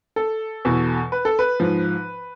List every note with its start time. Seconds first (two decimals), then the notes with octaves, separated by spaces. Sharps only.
0.16 A4
0.65 E2 B2
1.12 B4
1.25 A4
1.39 B4
1.60 G#2 F3